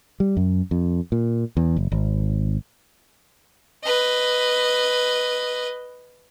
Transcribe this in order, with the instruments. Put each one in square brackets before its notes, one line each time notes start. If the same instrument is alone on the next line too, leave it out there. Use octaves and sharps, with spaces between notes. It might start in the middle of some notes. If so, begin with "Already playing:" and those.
[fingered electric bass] G3
F#2
F2
A#2
E2
F#1
G#1
[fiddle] B4 D#5